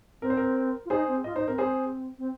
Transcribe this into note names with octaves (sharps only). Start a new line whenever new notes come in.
C4 A#4
C5
A#4
F4
D#4 G#4 C5
C4
F4 D#5
D#4 C5
C4 A#4
C4 G#4 C5
C4